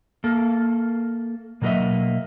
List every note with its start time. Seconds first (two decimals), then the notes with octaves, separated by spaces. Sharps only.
0.24 A#3 A4
1.62 B2 F#3 A#3 G#4 D#5 E5